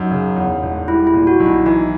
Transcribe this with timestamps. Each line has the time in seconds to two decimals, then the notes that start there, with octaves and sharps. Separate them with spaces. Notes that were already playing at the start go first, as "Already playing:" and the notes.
Already playing: F#2 D#4
0.11 C#3
0.36 E2
0.63 E1
0.88 G3 E4
1.07 E4
1.14 A#2
1.27 F#4
1.40 B1
1.46 E4
1.66 E3 D#4